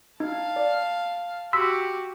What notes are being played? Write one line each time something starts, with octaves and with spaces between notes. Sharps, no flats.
D#4 F5 A5
D5
F#4 G4 C6 E6 B6